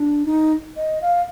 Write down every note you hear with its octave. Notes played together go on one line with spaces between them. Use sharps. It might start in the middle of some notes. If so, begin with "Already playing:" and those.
Already playing: D4
D#4
D#5
F5